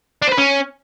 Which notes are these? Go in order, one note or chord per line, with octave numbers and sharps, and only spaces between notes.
D4
C5
B4
C#4